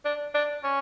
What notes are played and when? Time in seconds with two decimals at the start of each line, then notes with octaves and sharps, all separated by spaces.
0.05 D4
0.34 D4
0.64 C#4